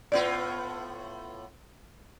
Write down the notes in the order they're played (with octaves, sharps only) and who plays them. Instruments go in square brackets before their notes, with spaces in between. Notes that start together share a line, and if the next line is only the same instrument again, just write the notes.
[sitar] A2 B3 F4 [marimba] D5